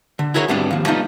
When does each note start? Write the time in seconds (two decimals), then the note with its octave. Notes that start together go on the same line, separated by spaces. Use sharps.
0.19 D3
0.34 E4 F#4 G#4 A#4 C5 C#5
0.48 D2 G#2 G3 B3 C4 D4
0.71 D#2 F3
0.86 G3 A3 B3 D#4 F4